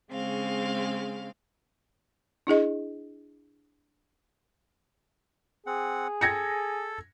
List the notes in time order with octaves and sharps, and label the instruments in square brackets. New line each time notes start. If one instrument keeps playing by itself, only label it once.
[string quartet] C#3 G#3 C4 F5
[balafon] D4 E4 G#4 D#5
[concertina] C4 F#5 [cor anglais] G#4
[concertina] A4 [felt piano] G#6 A#6 C#7